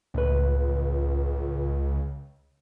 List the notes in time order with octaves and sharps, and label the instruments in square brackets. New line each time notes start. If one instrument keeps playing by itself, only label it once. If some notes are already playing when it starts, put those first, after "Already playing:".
[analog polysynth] C#2 [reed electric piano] A2 B4